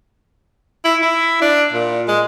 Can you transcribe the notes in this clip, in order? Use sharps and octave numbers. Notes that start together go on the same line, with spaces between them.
E4
E4
D4
A#2
G#3